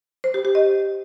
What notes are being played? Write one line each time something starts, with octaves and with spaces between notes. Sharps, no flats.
C5
G4
G4
D#5